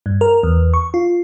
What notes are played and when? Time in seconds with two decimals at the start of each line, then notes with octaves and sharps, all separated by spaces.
0.06 G2
0.21 A#4
0.43 E2
0.74 C#6
0.94 F4